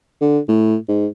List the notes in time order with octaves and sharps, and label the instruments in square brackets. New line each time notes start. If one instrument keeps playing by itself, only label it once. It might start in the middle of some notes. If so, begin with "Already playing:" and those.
[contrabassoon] D3
A2
G#2